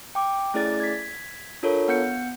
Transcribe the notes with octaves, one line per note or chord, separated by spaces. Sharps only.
G5 D6
A3 C#4 E4 G#4 D5 A6
G#6 B6
D4 F4 A4 A#4 C#5
B3 F#5 G6 C#7